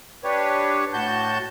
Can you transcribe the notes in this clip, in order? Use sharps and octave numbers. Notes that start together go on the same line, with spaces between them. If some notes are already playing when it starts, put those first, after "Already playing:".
D4 G4 B4 C#5
A2 F#4 A5 G6